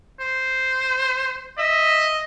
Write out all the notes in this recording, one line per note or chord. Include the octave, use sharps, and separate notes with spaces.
C5
D#5 E5